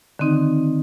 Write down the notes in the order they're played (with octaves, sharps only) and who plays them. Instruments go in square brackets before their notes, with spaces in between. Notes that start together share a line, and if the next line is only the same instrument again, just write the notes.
[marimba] D3 D#3 C4 D#4